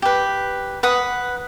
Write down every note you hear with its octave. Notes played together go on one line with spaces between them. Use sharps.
G4 B4
B4 F#5 D#6